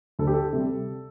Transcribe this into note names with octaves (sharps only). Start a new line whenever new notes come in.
D2 A4
G4
A4
C3 G3